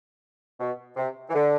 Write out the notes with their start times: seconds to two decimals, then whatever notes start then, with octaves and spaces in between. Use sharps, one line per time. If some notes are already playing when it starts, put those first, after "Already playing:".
0.60 B2
0.97 C3
1.30 E3
1.34 D3